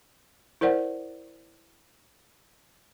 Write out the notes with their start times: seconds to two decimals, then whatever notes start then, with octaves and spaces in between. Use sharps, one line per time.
0.61 E4 A#4 C5 D5 F#5